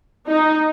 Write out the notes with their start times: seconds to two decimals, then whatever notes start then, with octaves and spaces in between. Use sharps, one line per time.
0.27 D#4